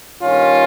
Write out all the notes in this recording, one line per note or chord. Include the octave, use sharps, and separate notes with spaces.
G2 D#3 C#4 F4